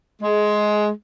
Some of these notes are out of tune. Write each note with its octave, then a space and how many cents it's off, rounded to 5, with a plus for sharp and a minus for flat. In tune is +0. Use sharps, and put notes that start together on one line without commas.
G#3 +15